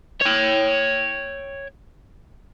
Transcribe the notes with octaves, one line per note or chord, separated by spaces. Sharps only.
C#5 G5